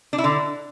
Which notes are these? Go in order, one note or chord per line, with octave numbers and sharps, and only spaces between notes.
D4
E4
D3